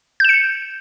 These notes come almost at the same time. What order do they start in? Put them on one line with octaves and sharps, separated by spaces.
G6 E7 C#7